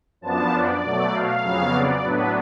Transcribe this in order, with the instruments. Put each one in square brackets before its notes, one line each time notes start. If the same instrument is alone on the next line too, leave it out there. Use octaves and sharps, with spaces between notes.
[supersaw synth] F#2 F3 B3 D4 A5
D5
B2 F#3 A3
F5
F2 C#3 F#3 B3
D5
A2 F#3 B3 D4 B4